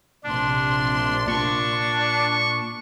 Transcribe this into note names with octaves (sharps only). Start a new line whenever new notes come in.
A#1 C3 D4 C6
A#2 D4 C#6